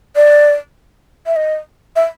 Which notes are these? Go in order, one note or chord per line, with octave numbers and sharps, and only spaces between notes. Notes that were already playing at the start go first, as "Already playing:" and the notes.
D5
E5
D#5
E5